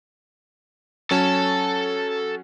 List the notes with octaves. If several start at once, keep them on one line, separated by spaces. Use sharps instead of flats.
F#3 C#4 A4 A5